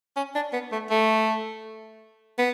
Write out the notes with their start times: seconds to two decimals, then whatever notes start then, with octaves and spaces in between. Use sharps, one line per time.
0.17 C#4
0.35 D4
0.53 B3
0.72 A3
0.91 A3
2.39 B3